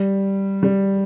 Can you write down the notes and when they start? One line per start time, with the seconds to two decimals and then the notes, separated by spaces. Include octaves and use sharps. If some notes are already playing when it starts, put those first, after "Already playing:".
Already playing: G3
0.63 G3